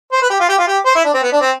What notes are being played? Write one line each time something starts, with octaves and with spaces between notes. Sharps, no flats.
C5
B4
G4
F4
G4
F4
G4
C5
E4
D4
C4
B3
D4
C4